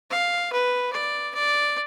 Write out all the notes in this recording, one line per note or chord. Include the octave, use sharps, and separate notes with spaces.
F5
B4
D5
D5